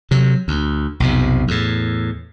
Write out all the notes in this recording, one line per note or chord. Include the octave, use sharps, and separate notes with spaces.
C3 F#3
D2
B1 F2 C3
E2 A2